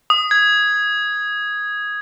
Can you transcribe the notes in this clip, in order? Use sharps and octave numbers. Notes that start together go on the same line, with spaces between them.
D#6
G#6